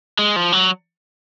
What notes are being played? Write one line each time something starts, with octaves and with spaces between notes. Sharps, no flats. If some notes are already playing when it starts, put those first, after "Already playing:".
G#3
F3
F#3